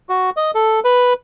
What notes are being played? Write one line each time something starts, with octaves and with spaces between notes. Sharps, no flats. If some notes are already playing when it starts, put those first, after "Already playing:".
F#4
D#5
A4
B4